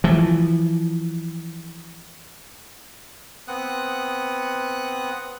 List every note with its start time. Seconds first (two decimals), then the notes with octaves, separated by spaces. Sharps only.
0.04 E3 F3
3.48 B3 C4 F#5 D#6 F#6